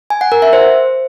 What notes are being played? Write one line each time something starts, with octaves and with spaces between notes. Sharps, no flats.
G#5
F#5
A#4
E5
C5